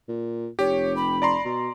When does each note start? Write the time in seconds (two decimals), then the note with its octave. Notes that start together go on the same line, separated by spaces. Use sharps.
0.08 A#2
0.59 F1 G4 C#5
0.96 B5
1.22 D5 A#5 C6
1.45 B2